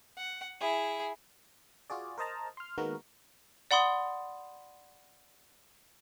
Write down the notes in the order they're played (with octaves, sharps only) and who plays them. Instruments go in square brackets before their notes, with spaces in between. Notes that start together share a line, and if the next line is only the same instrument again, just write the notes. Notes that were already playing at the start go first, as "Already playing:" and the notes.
[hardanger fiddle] F#5
E4 G#4
[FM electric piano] F4 F#4 G#4 D5
A#4 C5 D#5 A5 A#5
C6 F6
D#3 G#3 A#3 B3 F#4 A#4
[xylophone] D5 F#5 B5 C6 D#6